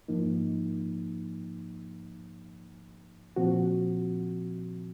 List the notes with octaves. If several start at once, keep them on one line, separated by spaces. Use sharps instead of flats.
G#2 F3 A#3 D#4
A#2 F3 C4 F#4